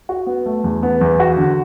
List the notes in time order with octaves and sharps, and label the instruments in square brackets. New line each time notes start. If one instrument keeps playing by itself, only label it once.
[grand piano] F#4
B3
A3
E2
B3
E2
F#4
D3